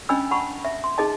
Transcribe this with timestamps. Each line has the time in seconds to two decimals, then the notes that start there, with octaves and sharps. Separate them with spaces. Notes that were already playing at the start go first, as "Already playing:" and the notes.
0.09 C#4 D4 D#5 G#5 B5 E6
0.31 F#5 A5 B5 C#6
0.65 E5
0.84 C6
0.98 D#4 G#4 D#5 A5